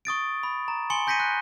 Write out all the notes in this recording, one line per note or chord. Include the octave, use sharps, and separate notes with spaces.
C#6 D#6 A6 D7
B5
A#5
G#5 C6 C#7 G7
G#5 G6 A#6 B6 C#7 D#7
F#6